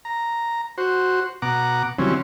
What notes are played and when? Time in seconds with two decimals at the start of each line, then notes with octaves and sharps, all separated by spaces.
0.05 A#5
0.78 F#4 C5
1.42 B2 F#5 A#5 D6
1.99 C#3 E3 F#3 G3 C4 C#4